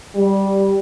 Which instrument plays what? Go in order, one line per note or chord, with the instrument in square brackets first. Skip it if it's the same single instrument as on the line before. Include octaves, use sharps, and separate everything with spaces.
[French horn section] G3